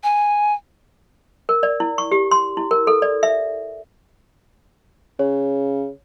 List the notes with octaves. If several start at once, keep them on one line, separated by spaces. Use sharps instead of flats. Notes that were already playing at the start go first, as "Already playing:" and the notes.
G#5
A#4
D5
E4
C#6
G4
C6
E4
A#4
A4
D5
E5
C#3 C#5